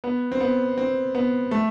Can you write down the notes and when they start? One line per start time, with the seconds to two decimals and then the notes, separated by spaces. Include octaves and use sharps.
0.04 B3
0.32 C4
0.41 B3
0.78 C4
1.15 B3
1.51 A3